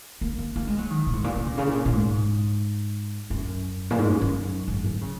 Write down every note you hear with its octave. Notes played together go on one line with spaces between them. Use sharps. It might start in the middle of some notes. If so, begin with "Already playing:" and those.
A#3
A#3
A#3
G#3
F#3
D#3
A#2
G#2
A#2
C#3
A#2
C#3
A#2
A#2
G#2
F#2
A#2
G#2
F#2
F#2
G#2
F#3
C#3